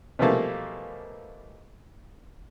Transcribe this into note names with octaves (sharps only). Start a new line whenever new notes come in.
B2 E3 F3 G3 A3 A#3